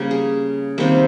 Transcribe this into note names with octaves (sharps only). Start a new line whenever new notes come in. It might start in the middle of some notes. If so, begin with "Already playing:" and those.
Already playing: C#3 G3 A#3
G#4
C3 D#3 G3 A#3